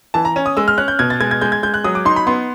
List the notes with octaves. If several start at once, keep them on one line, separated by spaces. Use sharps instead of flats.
E3 A5
A#5
C#4
D#6
G#3 E6
F6
C#4 F#6
G6
B2 G#6
A6
G#3 G#6
G#6
G#3 G6
G#6
G#3 G6
F#6
F#3 D#6
D6
D#4 C6
B5
B3 C6